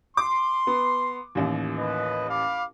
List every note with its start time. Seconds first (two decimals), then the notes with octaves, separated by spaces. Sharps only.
0.17 C6 D6
0.67 B3
1.35 A1 D#2
1.78 B4 D#5
2.29 F5 B5 D6